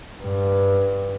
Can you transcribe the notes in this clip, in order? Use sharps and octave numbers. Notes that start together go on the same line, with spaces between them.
G2